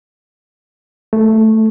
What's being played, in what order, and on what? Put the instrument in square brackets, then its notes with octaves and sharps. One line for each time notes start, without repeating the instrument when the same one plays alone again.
[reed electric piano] A3